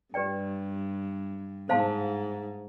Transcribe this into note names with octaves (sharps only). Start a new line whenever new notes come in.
G2 G4 B4 D5 G5
G#2 C5 F5 A5 C6